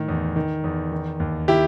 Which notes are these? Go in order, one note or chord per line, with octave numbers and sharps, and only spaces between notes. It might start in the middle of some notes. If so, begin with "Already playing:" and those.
Already playing: A2 D#3
E2
D#3
E2
D#3
D#2
D#3 E4 G4